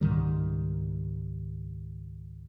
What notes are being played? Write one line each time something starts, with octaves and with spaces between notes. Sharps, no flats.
C#2 G#2 D#3 G3